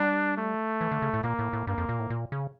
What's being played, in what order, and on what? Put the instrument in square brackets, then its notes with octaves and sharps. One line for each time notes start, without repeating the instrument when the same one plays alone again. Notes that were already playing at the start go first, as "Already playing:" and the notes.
Already playing: [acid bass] G3 [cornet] D4
[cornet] A3
[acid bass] E3
D3
C#3
A2
[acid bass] A#2 [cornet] A#3
[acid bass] A2
A2
[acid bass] G2 [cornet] A#3
[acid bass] F2
A#2
A2
A#2
C#3